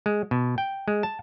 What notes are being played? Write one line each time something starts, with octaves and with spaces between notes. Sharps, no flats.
G#3
B2
G5
G#3
A5